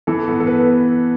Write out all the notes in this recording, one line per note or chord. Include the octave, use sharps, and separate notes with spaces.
E3 A4
B3
A4
B3 B4